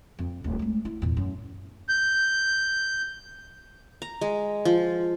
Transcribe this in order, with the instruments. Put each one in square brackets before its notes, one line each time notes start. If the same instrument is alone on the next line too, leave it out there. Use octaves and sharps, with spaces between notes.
[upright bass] F2
D1
G#3 A3
E4
E2 A#2
F#2
[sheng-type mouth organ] G6
[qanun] A#5
G#3
F3